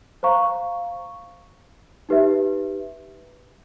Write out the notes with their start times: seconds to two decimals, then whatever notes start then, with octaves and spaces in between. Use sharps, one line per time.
0.23 C5 F5 A#5 C#6
2.09 D#4 G4 B4 E5